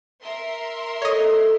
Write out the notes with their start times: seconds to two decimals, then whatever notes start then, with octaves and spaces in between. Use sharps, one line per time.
0.22 A#4 E5 C6
1.02 A4 C#5 D#5